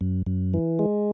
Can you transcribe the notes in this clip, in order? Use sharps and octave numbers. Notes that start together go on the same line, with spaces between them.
F#2
F#2
E3
G#3